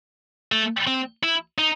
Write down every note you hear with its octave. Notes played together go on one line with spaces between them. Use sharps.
A3
C4
E4
D#4